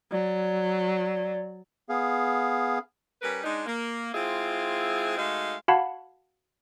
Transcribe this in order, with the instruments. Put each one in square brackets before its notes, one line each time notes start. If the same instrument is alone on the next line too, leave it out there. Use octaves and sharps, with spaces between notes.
[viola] F#3 [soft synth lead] D5
[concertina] B3 G#4 F5
[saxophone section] G3 C#4 A#4 B4
G#3 D4 D#4
A#3
G#3 C4 E4 F4 G#4
G#3 A3 D#4 F#4 F5
[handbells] F#4 F5 F#5 A5 B5 G#6